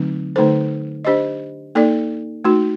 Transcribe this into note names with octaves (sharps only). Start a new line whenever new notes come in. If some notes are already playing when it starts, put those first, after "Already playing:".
Already playing: D3 F#3 A3 C4 D#4
D3 A3 D#4 A4 C5
D4 G4 C5 D#5
A#3 D#4 A4 D5
A3 D#4 F#4